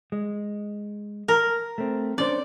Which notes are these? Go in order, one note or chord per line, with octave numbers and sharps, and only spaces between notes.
G#3
A#4
A3 C4
C#4 D4 C5 D5